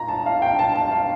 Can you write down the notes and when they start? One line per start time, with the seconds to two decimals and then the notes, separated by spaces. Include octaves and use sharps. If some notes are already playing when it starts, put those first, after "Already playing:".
Already playing: A#2 A#5
0.08 A5
0.26 F5
0.42 G5
0.59 A5
0.76 A5
0.91 F5